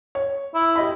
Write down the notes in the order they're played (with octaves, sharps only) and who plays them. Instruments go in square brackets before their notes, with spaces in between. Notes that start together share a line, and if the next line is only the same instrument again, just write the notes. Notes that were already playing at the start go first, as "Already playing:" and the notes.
[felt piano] C#5
[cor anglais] E4
[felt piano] G4 D#5 B5